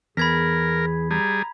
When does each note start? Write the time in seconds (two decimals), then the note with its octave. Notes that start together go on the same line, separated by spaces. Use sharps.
0.17 E2 G#4 A#4 B5 G#6 B6
1.11 G3 G#4 A#5